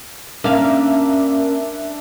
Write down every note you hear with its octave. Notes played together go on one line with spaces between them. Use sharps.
A#3 C#4 D4 E5 F5